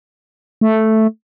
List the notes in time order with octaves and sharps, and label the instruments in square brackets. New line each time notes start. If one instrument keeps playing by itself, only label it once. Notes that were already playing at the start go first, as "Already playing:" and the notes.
[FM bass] A3